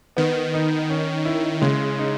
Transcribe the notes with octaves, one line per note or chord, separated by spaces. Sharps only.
D#3 B3
D#4
C#4
E4
C#3 G#3
D#4